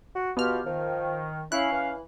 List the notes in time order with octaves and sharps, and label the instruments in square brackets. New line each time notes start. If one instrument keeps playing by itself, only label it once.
[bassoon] F#4
[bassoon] B2 [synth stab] B3 F6 [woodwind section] F4 G4
[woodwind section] D#3 [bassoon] F3
[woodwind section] C#4 F5 [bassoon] E4 [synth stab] F#6
[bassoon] E3